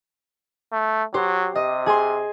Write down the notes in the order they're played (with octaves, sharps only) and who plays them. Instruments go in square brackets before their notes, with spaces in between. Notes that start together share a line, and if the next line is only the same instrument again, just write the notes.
[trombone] A3
[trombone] F#3 [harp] G4 C5
[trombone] C3 [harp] D#5
[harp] G#4 G#5 C6